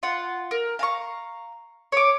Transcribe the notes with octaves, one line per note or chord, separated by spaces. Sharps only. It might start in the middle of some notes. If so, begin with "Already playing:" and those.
F4 F#5
A#4
F5 A#5 C#6
C#5 D6